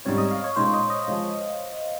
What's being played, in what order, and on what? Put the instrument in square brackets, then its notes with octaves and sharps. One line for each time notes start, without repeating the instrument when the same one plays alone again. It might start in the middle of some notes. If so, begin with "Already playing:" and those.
[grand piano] G#2 G3 C4 [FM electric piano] C#5
[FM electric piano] D#5
F5
C#5
[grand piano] A#2 G#3 D#4 [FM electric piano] C5
[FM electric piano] D#5
D#5
[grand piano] F3 G#3